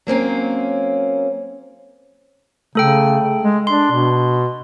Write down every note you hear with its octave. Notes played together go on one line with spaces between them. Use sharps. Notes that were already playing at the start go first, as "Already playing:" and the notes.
F#3 A#3 C4 C#4
C#3 A3 A4 G5
G#3
D4 C6
B2